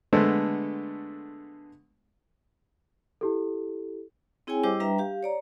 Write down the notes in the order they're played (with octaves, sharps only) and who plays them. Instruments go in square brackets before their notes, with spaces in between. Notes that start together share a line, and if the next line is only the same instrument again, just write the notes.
[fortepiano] D3 G#3 A3 B3 A4 C5
[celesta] E4 G4 A4
[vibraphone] C4 E4 G#4 C#5 G5 G#5
G3 E4 G4 C5 D#5 D6
G3 D4 B4 E5 G5 A#5
G4 F5
C#5 D5 A#5